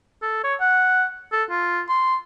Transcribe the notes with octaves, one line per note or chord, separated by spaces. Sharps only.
A4
C#5
F#5
A4
F4
C6